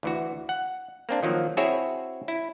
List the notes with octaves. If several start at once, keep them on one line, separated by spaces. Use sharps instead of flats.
D2 E3 F#4
F#5
A#3 C4 D4
D#3 F3 F#3 A#3
C4 E4 F#4 G#4 C#5 E5
E4